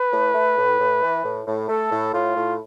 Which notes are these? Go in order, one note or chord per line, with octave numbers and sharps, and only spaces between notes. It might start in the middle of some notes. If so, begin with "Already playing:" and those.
Already playing: B4
A2
A3
A2
A2
E3
A2
A2
A3 A4
A2
A2 F4
A2